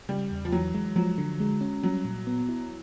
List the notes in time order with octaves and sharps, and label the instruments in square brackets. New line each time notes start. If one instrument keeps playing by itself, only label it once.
[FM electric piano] C#3 [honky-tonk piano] G3
[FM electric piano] E2
[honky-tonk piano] F3
[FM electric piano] E3 [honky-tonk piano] F#3
[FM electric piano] G#3
[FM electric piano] F3 [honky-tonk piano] F#3
[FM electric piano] D3
G#3
C#4
[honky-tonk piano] F#3 [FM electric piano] G3
[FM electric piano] A#2
B3
E4